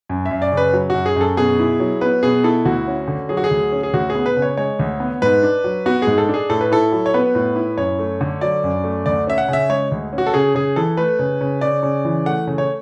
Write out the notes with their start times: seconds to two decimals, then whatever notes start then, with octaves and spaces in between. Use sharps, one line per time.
0.09 F#2
0.26 E5
0.31 F#2
0.42 D5
0.52 C#3
0.57 B4
0.73 F#3
0.90 F#2 F#4
1.06 G#4
1.16 F#2 A4
1.37 B2 G#4
1.59 E4
1.80 F#3
2.01 B3 B4
2.23 B2 G#4
2.44 E4 A4
2.65 D2 F#4
2.87 C#4
3.08 D3
3.29 F#3 G#4
3.37 F#4
3.44 G#4
3.51 D2
3.72 C#4
3.83 G#4
3.94 D2 F#4
4.10 G#4
4.15 B3
4.26 B4
4.36 C#3
4.42 C#5
4.57 G#3 C#5
4.79 D2
5.00 B3
5.22 G#2 B4
5.43 D4
5.64 F#3
5.86 B3 F#4
6.02 G#2 G#4
6.18 A4
6.29 D4 G#4
6.50 A2 A4
6.61 B4
6.72 E4 A4
6.92 F#3
7.06 C#5
7.14 B3 B4
7.35 A2
7.56 E4
7.78 F#2 C#5
7.99 A3
8.21 D3
8.41 F#3 D5
8.64 F#2
8.84 A3
9.06 D2 D5
9.27 C#4 E5
9.38 F#5
9.48 C#3 E5
9.70 G#3 C#5
9.92 D2
10.13 C#4
10.18 F#4
10.27 A4
10.34 C#3 G#4
10.55 C#3 G#4
10.76 E3 A4
10.97 A3 B4
11.19 C#3
11.41 C#3
11.61 C#3 D5
11.83 C#3
12.05 E3
12.26 A3 F#5
12.47 C#3
12.58 C#5